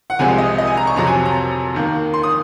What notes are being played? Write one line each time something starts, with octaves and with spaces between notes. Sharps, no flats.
F#5
C2 C3 F3 G#3 C4 G#5
D#5
D#5
G#5
A#5
C#6
F2 C3 F#3 C4 A#5
G#5
A#5
D#2 D#3 A#3
C6
D#6